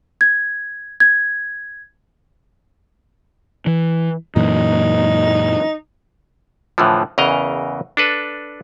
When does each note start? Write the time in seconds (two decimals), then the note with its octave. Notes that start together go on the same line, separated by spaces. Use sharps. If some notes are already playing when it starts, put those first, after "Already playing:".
0.21 G#6
1.00 G#6
3.67 E3
4.36 F#2 A#2 E3 D#4
6.78 A2 D3 E3 F3
7.18 E2 C#3 E3 A#4 D#5 A#5
7.97 D4 A4 B4